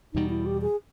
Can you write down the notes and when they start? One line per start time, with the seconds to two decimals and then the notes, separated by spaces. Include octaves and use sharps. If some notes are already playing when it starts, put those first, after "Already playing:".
0.14 E2 B2 G3 D#4
0.30 E4
0.46 G4
0.62 G#4